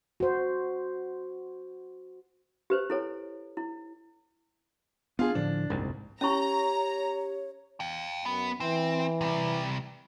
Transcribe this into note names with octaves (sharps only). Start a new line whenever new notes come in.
F#4 C5
G4 B4 C5
E4 A4 C#5
E4
B3 D4 F4 G#4
A2 D3 F3 D4
F#1 C2 G#2
C#4 E4 G4 C#5 A#5 C#6
F5 G5
F#2 B3
E3 C4
C3 G3